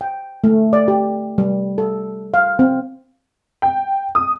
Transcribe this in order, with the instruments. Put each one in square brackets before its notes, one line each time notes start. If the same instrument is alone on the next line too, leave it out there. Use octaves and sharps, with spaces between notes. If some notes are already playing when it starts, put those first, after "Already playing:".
[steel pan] G5
A3
D5
G4
G3
A4
F5
C4
[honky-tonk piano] G5
D#6